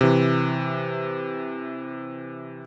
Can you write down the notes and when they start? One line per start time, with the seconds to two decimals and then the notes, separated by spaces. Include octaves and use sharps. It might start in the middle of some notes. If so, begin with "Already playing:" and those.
0.01 C3 E3